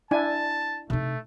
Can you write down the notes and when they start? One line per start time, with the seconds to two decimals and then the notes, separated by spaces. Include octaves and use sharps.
0.11 D4 E4 G#5 A5
0.90 C3 A3 D#4